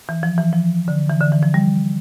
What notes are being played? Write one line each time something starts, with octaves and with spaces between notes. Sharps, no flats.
E3
F3
E3
F3
D3
E3
D3
E3
F3
G3